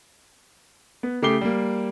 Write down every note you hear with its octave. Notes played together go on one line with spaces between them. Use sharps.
B3
C#3 A3 G4 D6 C7 G7
G3 A#3